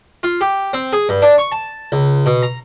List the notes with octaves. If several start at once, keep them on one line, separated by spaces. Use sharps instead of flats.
F4
G4
C4
G#4
G2
D4
C#6
A5
C#2
B2
A#5